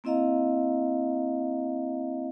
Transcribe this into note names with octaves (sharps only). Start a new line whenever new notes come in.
A#3 C4 E4 D#5 F5 A#5